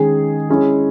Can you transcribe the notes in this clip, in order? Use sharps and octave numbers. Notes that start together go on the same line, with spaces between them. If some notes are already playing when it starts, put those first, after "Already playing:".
Already playing: D#3 G#3 C#4 G#4
G#3 C#4 E4 G#4